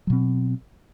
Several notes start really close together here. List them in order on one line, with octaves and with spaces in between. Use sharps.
F#3 B2 C4